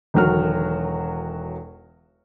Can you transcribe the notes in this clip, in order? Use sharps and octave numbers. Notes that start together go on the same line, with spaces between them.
E1 D3 D#3 F#3 F#4 F6